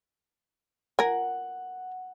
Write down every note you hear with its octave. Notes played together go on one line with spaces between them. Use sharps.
A#4 F#5 G#5